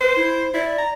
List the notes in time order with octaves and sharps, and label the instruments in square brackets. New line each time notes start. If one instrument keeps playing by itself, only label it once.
[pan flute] B4 [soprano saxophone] C5
[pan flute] E4
[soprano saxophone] E4 [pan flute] D5
[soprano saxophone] A#5